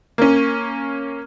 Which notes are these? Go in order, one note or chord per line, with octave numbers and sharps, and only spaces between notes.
A#3 C#4